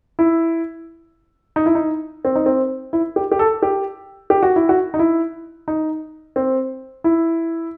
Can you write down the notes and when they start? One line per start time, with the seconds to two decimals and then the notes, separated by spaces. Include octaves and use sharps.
0.19 E4
1.56 D#4
1.66 E4
1.75 D#4
2.25 C4
2.35 D#4
2.46 C4
2.93 E4
3.16 G4
3.32 G4
3.39 A4
3.62 G4
4.30 G4
4.43 F#4
4.56 E4
4.69 F#4
4.94 D#4
4.99 E4
5.68 D#4
6.36 C4
7.04 E4